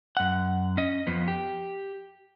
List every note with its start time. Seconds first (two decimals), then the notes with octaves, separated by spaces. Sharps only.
0.17 F#2 F#5
0.77 C#4 D#5
1.07 F2 F3 B3
1.28 G4